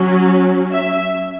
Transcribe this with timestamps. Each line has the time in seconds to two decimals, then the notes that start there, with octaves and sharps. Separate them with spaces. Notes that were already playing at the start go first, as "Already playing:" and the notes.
Already playing: F#3 C#4
0.72 E5